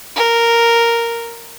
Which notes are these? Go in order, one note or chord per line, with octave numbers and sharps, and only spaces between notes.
A#4